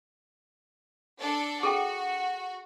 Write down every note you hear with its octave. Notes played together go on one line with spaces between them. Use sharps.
D4 A4 D5
F#4 G#4 A4 G5